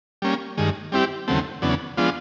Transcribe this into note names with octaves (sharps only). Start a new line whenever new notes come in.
G3 A#3 C#4
G2 D#3 G#3
G3 C4 E4 G4
D#2 C#3 F#3 A3 C4
E2 C#3 F#3 B3 D4
F3 G#3 B3 D4 F4